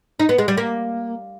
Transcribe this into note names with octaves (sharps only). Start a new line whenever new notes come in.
D#4
B3
G#3
G3
A#3